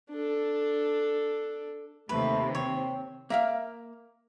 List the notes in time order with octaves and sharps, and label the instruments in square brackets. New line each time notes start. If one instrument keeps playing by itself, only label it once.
[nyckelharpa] D4 A4
[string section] D#2 C3 [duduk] A3 [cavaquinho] B4
[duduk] C4 [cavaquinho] C#5
[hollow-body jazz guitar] A#3 E5 F5